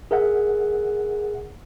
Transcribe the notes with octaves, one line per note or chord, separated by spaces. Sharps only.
G#4 A#4 E5 F#5